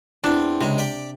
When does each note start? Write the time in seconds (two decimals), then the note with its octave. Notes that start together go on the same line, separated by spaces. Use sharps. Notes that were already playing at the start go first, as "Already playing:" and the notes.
0.24 E2 C4 D4
0.61 C#2 C3 G#3
0.78 G4 D5